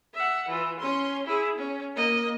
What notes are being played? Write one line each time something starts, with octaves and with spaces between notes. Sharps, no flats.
E5 F#5
E3 F4
C#4 C6
E4 G#4
C#4
A#3 D#5